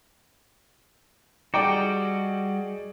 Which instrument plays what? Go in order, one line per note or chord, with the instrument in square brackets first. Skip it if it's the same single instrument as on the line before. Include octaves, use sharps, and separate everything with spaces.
[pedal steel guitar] G3 F#4 [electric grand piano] G#4 D5 D#5 [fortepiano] G5 A#5 D6